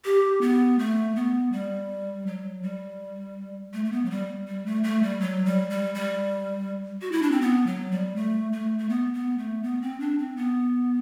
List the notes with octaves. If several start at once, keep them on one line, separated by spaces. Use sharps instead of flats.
G4
B3
A3
B3
G3
F#3
G3
A3
A3
B3
F#3
G3
G3
A3
A3
G3
F#3
G3
G3
G3
F#4
E4
D4
C4
B3
F#3
G3
A3
A3
A3
B3
B3
A3
B3
C4
D4
C4
B3